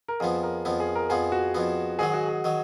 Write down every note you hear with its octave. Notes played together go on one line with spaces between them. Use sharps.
A#4
F2 F3 B3 G#4
A#4
F2 F3 B3
G#4
A#4
F2 F3 B3 G#4
F#4
F2 F3 B3
G#2 D#3 F#3 G#4
F#4
G#4
D#3 F#3